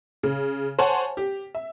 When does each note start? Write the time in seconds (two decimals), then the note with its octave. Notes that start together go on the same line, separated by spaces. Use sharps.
0.23 C#3
0.79 C5 C#5 F#5 G#5 A5
1.17 G4
1.55 E5